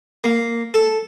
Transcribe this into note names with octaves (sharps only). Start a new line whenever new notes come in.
A#3
A4